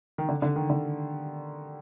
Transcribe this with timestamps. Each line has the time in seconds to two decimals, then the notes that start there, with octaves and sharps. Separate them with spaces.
0.18 D#3
0.29 D3
0.42 D3
0.56 D#3
0.70 D3